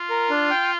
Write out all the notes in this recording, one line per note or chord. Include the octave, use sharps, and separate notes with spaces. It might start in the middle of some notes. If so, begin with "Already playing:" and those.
Already playing: F4
A#4
D4
G5